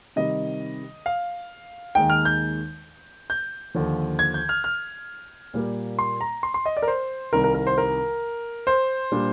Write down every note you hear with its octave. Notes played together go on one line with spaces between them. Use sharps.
C3 D#3 G3 D#5
F5
D#2 D#3 G#3 D#4 G5
F6
G6
G6
D#2 D3 F3
G#6
G6
F6
F6
A#2 G3 A#3
C6
A#5
C6
C6
D#5
D5
A#4
C5
C2 C3 D#3 A#4
A#4
A#4
C5
A#4
C5
A#2 G3 D4